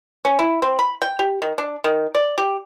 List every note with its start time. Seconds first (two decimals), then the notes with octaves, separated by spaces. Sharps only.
0.25 C#4
0.39 E4
0.62 C4
0.79 B5
1.02 G5
1.19 G4
1.42 D#3
1.58 D4
1.84 D#3
2.15 D5
2.38 G4